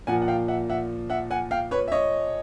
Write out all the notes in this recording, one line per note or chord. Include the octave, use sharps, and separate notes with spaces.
A#2 F3 F#5 G#5
F#5
F5 G5
E5 F#5
E5 F#5
E5 F#5
F#5 G#5
F5 G5
B4 C#5
E5
C#5 D#5